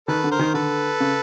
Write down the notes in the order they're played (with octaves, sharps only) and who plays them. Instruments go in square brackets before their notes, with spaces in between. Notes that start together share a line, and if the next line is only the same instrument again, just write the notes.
[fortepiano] D#3 [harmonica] A4 B4
[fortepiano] D3
[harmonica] A#4 C5
[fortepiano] D#3
[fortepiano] D3 [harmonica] A4 B4
[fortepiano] C#3